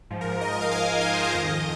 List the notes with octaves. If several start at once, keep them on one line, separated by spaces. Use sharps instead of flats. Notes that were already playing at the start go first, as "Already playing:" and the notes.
G#2 F3
A#4
D#5
D#5
F5
G#5
D#5
C5
D#5
F2 D#3